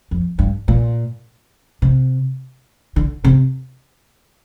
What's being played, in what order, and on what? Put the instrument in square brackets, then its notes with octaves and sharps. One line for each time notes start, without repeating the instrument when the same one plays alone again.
[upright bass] F2
G2
A#2
C3
D3
C3